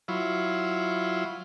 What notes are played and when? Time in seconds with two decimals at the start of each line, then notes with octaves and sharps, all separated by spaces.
0.08 F#3 E4 F4